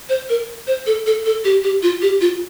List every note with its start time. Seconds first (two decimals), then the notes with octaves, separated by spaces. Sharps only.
0.09 C5
0.29 A#4
0.67 C5
0.86 A4
1.06 A4
1.25 A4
1.44 G4
1.64 G4
1.83 F4
2.02 G4
2.21 F4